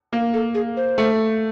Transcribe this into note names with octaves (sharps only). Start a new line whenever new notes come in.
A#3 A#4
A4
G#4
C5
A3